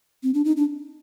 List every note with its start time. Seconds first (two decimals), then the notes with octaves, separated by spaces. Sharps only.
0.23 C4
0.34 D4
0.45 D#4
0.57 D4